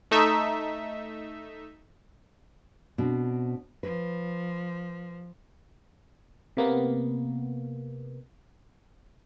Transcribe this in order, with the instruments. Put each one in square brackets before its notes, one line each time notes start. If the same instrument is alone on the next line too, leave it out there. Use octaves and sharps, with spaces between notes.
[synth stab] A3 D#4 E5
[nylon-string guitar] B2 C4 D4
[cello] F3 [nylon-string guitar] B4
[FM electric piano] C3 A#3 B3